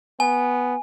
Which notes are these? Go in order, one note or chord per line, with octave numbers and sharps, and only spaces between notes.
B3 G#5